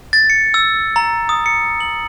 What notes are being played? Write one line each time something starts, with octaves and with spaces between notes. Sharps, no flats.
A6
C#7
E6
A#5
D#6
C#7
F#7